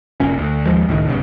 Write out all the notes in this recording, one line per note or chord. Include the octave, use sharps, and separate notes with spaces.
F1 A#2 C#4
D2
D#2 F3 G#3
C#2 A2 D#3
B1 G2 C#3